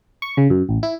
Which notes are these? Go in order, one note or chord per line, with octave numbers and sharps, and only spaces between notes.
C#6
C#3
F#2
A1
E4